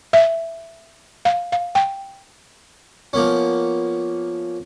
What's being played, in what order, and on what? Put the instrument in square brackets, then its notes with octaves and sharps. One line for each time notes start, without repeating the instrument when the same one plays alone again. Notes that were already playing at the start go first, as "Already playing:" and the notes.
[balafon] E5
F5
F5
G5
[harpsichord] F3 A#3 B3 C#4